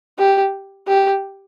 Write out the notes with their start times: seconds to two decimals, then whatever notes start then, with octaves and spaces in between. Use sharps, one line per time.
0.19 G4
0.88 G4